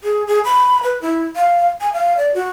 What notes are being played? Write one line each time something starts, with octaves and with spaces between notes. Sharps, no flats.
G#4
G#4
B5
B4
E4
F5
G#5
F5
D5
F#4